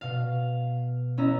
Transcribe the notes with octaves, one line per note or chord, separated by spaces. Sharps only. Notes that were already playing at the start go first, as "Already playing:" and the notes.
B2 F5
B3 C#4 E4 D#5 E5 A#5